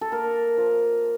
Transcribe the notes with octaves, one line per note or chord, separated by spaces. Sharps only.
A4
A#3 A#4
F3